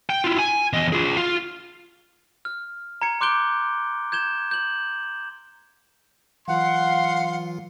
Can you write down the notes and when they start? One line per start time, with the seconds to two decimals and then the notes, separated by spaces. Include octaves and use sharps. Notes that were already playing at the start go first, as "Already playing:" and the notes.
0.10 G5
0.24 E4 F4
0.38 G#5
0.73 E2 D#5
0.93 F4 G#4
1.17 F4 F5
2.45 F6
3.02 A#5 G#6 C#7
3.21 C6 D6 F#6 G6 D7 G7
4.12 G6 G#6 E7 G7
4.51 G6 F#7
6.48 E3 F#3 F4 F5 F#5 C6